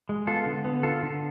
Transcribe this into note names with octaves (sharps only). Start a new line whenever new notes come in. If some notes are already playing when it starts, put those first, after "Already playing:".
G#3
B3 F4 A4
D3
B3
D3 F4 A4
D3